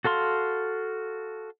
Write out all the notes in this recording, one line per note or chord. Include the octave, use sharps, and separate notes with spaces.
F#4 A4 F5 C6